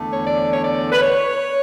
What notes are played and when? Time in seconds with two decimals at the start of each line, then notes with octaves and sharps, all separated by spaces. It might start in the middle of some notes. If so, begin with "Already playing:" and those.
Already playing: E2 D3 A3
0.13 C#5
0.26 D5
0.53 C#5
0.63 D5
0.92 B4
1.00 C#5